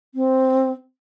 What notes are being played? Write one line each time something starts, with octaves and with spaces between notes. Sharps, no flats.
C4